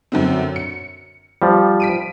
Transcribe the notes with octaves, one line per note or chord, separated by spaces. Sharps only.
F#2 D3 C4
C#7
F3 G3
B6 D7 D#7